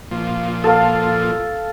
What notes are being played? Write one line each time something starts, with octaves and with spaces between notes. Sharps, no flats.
A#2 F3
A4 F5